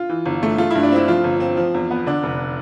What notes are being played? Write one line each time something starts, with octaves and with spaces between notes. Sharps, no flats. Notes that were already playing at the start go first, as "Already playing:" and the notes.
Already playing: F4
E3
G1
A3
A3 F4
G2 E4
D4
C4 E4
F3 F4
G1
C4
F3
E2
B3
D3 D4
F1